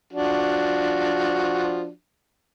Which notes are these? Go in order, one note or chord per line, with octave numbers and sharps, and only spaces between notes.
F3 D4 F#4